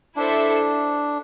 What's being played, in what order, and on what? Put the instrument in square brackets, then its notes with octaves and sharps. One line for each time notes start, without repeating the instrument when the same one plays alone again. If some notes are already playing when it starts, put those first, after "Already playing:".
[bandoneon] D4 [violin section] E4 A4 C5 E5